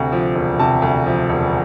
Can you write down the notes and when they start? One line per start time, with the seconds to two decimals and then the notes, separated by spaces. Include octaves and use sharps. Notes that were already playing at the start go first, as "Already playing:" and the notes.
Already playing: D2 C3
0.12 F3
0.35 E1
0.59 C3 A5
0.82 D2
1.06 F3
1.29 E1